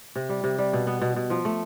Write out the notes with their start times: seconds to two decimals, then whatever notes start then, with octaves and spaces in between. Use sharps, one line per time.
0.16 C3
0.29 G3
0.44 C3
0.58 G3
0.73 B2
0.87 B3
1.02 B2
1.16 B2
1.30 F3
1.45 A3